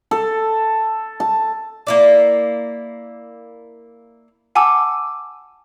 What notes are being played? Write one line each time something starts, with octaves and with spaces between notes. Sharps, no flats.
A4
A5
A#3 E4 D5
F#5 G#5 A5 D6 E6